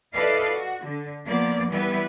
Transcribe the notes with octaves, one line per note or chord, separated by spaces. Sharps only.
E4 A4 B4 D5 D#5 F5
F#4
D3
F3 A#3 B3 D5
E3 G3 B3 E4 B4